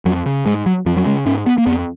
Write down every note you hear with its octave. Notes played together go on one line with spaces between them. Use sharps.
F2 F#3
C#3
G#2 G#3
F#3
F2 F3
F#3
C#3 G#3
G#2 C#4
B3
A#3
F2 B3